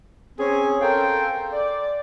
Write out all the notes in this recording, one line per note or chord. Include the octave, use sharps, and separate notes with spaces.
C4 C#4 G#4
A4 A#4 C5 F5 G5
D5